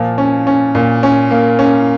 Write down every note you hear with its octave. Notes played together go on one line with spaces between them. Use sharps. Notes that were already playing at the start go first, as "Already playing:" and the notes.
Already playing: A#2 F3
C#4
C#4
A#2
C#4
A#3
C#4